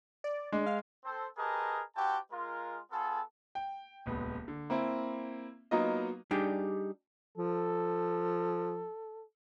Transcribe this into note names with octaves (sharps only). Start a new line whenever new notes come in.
D5
G#3 D4
F5
C4 A4 C5
G4 G#4 A#4 B4 D#5 A5
E4 F#4 G4 C5 G5 A5
G#3 F4 A#4
B3 F4 G#4 A4
G5
D#1 C#2 B3
D3
A#3 C4 E4
F#3 A#3 B3 D#4 F4 D#5
G3 D4 D#4 G4 G#4
F3 A4